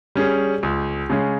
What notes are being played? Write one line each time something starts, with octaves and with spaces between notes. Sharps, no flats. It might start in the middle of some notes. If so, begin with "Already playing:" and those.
G3 C#4 G#4
C#2
C#3 G#3 C#4